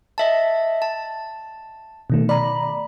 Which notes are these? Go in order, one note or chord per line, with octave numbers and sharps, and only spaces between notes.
D#5 E5 A5
A5
B2 D#3 A3
D5 A#5 B5